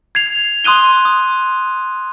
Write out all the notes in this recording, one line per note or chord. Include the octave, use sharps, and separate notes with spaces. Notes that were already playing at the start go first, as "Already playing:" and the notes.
G#6 C7 F7
C6 D#6 F#6 D#7 G7
D#6